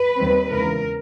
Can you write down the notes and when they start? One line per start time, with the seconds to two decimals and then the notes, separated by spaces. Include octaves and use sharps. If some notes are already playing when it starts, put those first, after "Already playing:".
Already playing: B4
0.17 D#2 D#3 G3 C4
0.50 E2 C#3 E3 G#3 A#4